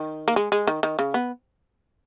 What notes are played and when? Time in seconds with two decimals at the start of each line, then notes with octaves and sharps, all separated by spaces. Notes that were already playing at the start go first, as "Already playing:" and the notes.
Already playing: D#3
0.28 A#3
0.36 G#3
0.52 G#3
0.67 D#3
0.83 D#3
0.99 C#3
1.14 B3